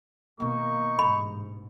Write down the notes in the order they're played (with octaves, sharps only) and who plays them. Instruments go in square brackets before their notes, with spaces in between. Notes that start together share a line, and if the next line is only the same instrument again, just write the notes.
[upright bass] B2 D#3 [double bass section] A#3 [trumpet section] D#4 C#6
[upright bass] E1 [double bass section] A1 G#2 [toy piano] B5